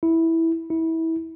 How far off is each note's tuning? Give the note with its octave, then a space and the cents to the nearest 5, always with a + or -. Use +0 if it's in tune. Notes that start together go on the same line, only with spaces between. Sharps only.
E4 -10
E4 -25